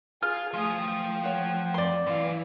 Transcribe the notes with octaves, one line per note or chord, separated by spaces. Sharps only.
F4 G#4 F6
F3 A3 F5 G#5 D#6
G5
C#5 F#5
F2 D5 C6
F#2 E3 F5